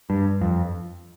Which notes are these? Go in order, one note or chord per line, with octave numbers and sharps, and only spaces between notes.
G2
F2